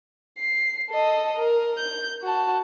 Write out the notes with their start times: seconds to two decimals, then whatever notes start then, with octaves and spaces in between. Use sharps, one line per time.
0.39 C7
0.90 A4 D#5
1.38 A#4
1.78 G6
2.22 F#4 A5